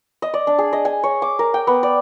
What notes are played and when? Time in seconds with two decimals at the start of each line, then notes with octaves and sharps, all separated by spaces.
0.22 D#5
0.34 D5
0.47 D4
0.58 G#4
0.73 D#5
0.85 G#5
1.04 C#5
1.22 D6
1.39 A#4
1.54 G5
1.67 B3
1.83 D5